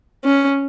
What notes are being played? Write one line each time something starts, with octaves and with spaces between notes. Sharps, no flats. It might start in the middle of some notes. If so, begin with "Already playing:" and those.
C#4